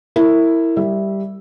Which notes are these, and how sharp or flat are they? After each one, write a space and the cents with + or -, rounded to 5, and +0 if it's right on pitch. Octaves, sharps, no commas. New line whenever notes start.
E4 +0 A#4 -30
G3 +0 E5 +0